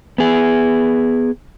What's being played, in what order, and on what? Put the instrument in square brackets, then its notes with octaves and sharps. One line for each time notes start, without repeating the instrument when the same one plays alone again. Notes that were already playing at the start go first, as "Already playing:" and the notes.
[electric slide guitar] B3 G#4